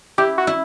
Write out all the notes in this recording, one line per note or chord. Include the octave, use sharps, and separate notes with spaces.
E4 G4
F#4
E4